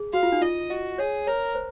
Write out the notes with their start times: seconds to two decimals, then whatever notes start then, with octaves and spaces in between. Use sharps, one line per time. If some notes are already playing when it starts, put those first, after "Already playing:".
Already playing: G#4
0.13 F#4 F5
0.23 F4
0.32 D#4
0.41 F4 D#5
0.70 F#4 D#5
0.98 G#4 C#5
1.27 A#4 C#5
1.55 C5